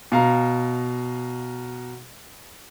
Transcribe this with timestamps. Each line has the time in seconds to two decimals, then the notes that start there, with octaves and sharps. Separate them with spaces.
0.12 B2 F5 A#5